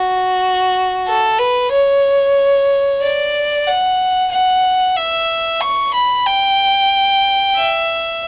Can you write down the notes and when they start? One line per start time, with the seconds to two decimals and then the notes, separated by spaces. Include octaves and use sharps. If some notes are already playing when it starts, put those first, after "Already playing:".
Already playing: F#4
1.07 A4
1.39 B4
1.72 C#5
3.02 D5
3.67 F#5
4.32 F#5
4.96 E5
5.61 C#6
5.93 B5
6.26 G5
7.56 E5